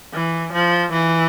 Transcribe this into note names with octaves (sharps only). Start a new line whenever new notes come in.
E3
F3
E3